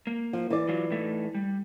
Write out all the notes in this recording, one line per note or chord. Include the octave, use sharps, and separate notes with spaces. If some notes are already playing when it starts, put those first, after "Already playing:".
A#3
F3
E3 D5
F#3 F4
A2 A3 D#4
G3